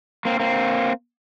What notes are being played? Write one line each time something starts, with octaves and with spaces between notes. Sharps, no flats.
A#3 C4
A#3 C4